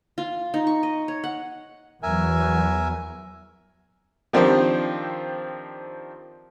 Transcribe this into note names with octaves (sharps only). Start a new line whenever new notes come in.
F4
D#4
C#6
D#5
C#5
F#5
E2 F#3 A#4 E5 G#5
D#3 F3 C4 D4 G4 C5